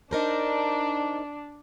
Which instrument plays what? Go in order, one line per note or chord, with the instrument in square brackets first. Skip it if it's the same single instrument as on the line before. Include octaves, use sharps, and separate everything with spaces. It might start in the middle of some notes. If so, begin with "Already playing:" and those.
[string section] D4 [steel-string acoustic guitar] D#4 A#4 C5